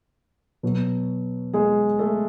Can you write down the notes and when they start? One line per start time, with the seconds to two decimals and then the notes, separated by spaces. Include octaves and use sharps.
0.63 B2 F#3
1.54 G#3 G#4
1.99 A3 A4